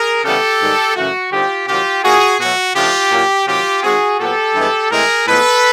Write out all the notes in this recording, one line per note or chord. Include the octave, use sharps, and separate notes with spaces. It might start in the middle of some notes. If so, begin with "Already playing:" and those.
Already playing: G#4 A#4
C#3 E3 G3 B3 G4 A4
G#2 D#3 G3
F#2 C#3 E3 A3 F#4
D3 G3 C4 D#4 F4 G4
C3 D#3 F#3 F4 G4
F3 A#3 D#4 F#4 G#4
B2 F#3 A3 F#4
C#3 F3 A3 D4 F4 G4
A#2 F#3 A#3 C#4 F4
C3 D#3 F#3 F4 G4
D#3 G#3 C4 F#4 G#4
A#2 F#3 B3 G4 A4
G2 E3 G#3 B3
A2 E3 G#3 C4 G#4 A#4
A2 F3 G#3 B3 A4 B4